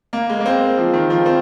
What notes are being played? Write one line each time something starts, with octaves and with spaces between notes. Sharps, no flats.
A#3
G#3
A#3
C4
F3
D#3
F3
C4